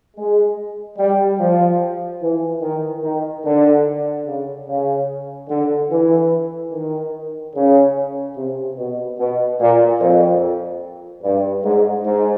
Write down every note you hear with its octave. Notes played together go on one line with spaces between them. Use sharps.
G#3
G3
F3
E3
D#3
D#3
D3
C#3
C#3
D3
E3
D#3
C#3
C3
B2
B2
A#2
F2
G2
G#2
G#2